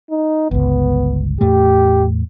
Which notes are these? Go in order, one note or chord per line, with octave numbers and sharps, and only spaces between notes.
D#4
G1 C#2 B3
E2 A2 A3 G4